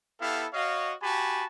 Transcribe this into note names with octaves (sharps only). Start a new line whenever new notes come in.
B3 E4 G4 A4 F5
F#4 C#5 D#5 F5
F#4 G4 G#5 A5 B5